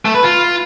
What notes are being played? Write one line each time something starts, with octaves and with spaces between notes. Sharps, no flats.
A3
B4
F4